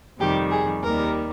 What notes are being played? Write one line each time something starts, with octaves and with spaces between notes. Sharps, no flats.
F2 C3 D#3 G3 G4
G#4
D#2 D#3 G3 A#4